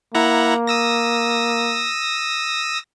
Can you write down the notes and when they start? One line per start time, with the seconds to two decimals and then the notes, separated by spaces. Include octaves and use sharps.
0.15 A#3 E4 F#5 A#5
0.67 D#6 E6 A#6